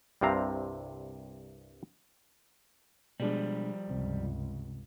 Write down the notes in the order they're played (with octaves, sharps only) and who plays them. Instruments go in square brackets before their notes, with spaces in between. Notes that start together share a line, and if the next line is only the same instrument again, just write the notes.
[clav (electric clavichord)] C2 G2 C3 C4 F5 A#5
[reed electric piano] B2 G#3 D4 [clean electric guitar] F3 G3
[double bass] C#2 G2 [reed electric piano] C3